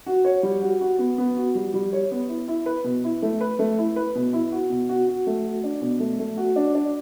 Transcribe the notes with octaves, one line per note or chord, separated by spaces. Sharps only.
F#4
C#5
G3
F#4
F#4
B3
B3
F#4
G3
G3
C#5
B3
E4
E4
B4
B2
E4
A3
B4
A3
E4
B4
B2
E4
F#4
B2
F#4
F#4
A3
F#4
D4
B2
A3
A3
F#4
D4
D4